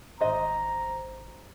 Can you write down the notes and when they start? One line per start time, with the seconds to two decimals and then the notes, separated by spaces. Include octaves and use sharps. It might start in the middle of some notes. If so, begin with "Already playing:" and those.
0.21 G#1 D4 C5 D#5 A#5